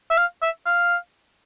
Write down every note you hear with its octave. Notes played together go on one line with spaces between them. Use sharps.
E5
F5
E5
F5